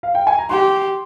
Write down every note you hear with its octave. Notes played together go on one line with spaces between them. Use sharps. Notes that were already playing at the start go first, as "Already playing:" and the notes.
F5
G5
G#5
A#5
G4 C6